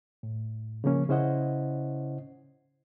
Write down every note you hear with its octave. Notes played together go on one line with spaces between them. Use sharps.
A2
C#3 F3 A#3 C#4
C#3 C#4 E4 C5 D#5 F#5